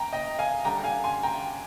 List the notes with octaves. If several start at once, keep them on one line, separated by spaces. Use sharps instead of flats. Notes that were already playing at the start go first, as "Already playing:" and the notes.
Already playing: G5 A#5
D#5 G5
F5 G#5
D3 G3 D4 G5 A#5
F5 G#5
G#5 C6
G5 A#5